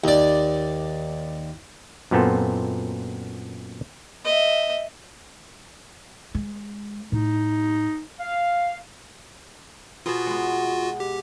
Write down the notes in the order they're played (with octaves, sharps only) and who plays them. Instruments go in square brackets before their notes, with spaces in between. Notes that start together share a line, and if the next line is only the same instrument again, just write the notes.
[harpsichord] D#2 D5
[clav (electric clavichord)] F#2 A#2 B3 C4 F4 A4
[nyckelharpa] D#5 E5
[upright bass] G#3
[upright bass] A2 [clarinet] D#4
[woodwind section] F5
[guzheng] B2 B3 G#4 [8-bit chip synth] F4 F#4
[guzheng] G#3 B3
[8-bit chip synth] G4